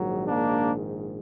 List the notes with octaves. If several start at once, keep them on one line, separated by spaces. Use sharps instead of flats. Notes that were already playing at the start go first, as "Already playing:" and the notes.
Already playing: A#1 G#2 D#3 F#3
A#3 D4